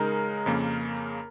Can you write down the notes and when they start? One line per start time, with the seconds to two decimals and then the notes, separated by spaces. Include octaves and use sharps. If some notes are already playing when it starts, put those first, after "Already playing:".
Already playing: C#3 G#3 D#4 A#4
0.46 F2 C#3 A#3